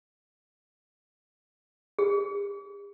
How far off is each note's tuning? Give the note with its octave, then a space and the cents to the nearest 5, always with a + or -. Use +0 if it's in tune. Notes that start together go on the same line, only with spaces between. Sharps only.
G4 +45